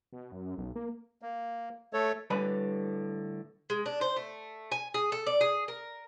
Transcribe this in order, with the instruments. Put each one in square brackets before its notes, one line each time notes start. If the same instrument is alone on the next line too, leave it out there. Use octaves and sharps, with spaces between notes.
[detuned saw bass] B2
F#2
B1
A#3
[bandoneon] A#3
A3 A4 C#5
[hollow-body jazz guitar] A2 D3 G3 B4 G#5 B5
[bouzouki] G#3
D4
C5
A3
G#5
G#4
A4
D5
G#4
A#4